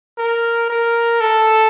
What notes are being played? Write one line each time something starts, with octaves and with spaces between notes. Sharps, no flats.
A#4
A#4
A4